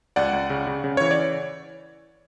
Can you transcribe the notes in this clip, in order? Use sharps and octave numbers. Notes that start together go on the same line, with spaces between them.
C#2 D5 F#5
C#2
C#3
C#3
C#3
E3 C#5
D5